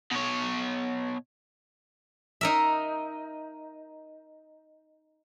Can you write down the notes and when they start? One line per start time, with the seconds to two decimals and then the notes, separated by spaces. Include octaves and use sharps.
0.12 B2 C#5
2.41 D#4 A#4 E5